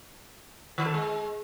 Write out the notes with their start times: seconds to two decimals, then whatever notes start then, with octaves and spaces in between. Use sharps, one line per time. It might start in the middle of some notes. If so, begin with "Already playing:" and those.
0.78 D#3
0.86 A4
0.94 G#3